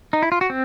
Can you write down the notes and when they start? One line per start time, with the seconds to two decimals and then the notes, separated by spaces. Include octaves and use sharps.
0.13 D#4
0.22 E4
0.32 F4
0.41 F#4
0.50 C4